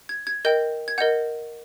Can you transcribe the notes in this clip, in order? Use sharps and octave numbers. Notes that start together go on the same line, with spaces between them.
G#6
G#6
A#4 D#5 G5 G6
G#6
A#4 D#5 F#5 G6